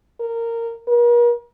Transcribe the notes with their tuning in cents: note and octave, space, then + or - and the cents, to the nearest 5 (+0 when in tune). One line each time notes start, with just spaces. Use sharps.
A#4 -15
A#4 +45